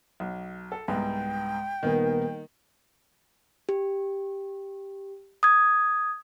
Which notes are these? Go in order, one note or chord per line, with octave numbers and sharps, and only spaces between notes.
B1
A4
C2 G#2 B3 G5
D#1 D#3 B3 A#4
G4
D#6 G#6